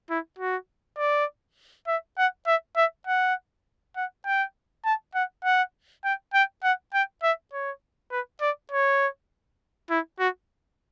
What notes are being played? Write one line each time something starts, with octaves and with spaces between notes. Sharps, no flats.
E4
F#4
D5
E5
F#5
E5
E5
F#5
F#5
G5
A5
F#5
F#5
G5
G5
F#5
G5
E5
C#5
B4
D5
C#5
E4
F#4